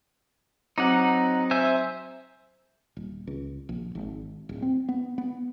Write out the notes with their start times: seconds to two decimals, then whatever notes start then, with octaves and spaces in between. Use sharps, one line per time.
0.78 F#3 C4 D#4 F#5 D6
1.51 C5 E5 G#5
2.97 D#1
3.27 C#2
3.69 A#1
3.95 G#1
4.49 D1
4.62 C4
4.89 B3
5.18 B3